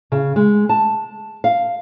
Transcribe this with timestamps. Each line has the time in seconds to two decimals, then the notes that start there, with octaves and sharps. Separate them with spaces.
0.12 C#3
0.36 G#3
0.69 A5
1.44 F5